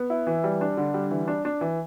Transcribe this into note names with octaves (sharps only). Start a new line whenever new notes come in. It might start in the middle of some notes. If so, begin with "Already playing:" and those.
Already playing: B3
E4
E3
G3
D4
D3
G3
E3
D4
D4
E3